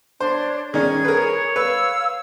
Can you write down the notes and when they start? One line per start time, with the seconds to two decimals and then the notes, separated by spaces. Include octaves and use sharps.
0.20 D4 C5 C#5
0.74 D#3 C#4 G#4 G#6
1.05 A#4 B4 C#5
1.56 B4 F5 E6